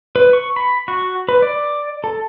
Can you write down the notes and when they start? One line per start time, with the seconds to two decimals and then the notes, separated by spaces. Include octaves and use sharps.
0.16 B4
0.33 C#6
0.56 B5
0.88 F#4
1.29 B4
1.42 D5
2.04 A4